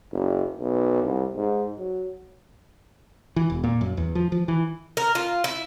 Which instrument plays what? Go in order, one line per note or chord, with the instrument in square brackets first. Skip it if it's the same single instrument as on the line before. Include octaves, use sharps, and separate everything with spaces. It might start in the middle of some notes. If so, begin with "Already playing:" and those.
[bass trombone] F#1
B1
C2
G#2
F#3
[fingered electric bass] E3
E1
A#2
F#2
E2
F3
F3
E3
[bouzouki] A#4
F4
E4